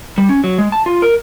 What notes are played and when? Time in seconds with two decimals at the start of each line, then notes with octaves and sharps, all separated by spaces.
0.18 G3
0.29 C#4
0.44 F#3
0.58 G#3
0.72 A5
0.86 F4
1.02 A#4